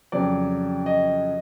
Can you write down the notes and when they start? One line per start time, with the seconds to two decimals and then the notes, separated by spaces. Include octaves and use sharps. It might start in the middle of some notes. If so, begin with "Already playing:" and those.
0.12 F2 C#3 F#3 D5
0.86 D#5